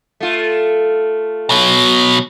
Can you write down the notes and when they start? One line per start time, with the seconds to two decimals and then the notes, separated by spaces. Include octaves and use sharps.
0.20 A3 F4
1.50 B2 F#3